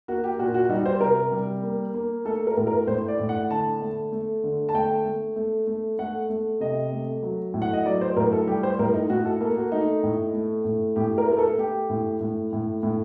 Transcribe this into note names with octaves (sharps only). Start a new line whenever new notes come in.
A#3 F#4
G4
A#2 F#4
F#4
F#4
G3 D#4
C5
C3 A#4
G3
A#3
A#3
A3 A4
A#4
A2
A#4
A2 C5
D5
A2
F#5
D3 A5
A3
A3
D3
A5
A3 G5
A3
A3
A3
A3 F#5
A3
C3 D#5
A3
F#3
A2
F#5
D#5
F#3 D5
C5
A2 A#4
A4
G3 G4
C5
A2 A#4
D#4
A2 F#4
A4
A#3 A4
F#4
A3 D#4
A2
A3
A2
A2 G4
A#4
A3 A#4
A4
A3 G4
A2
A2
A2
A2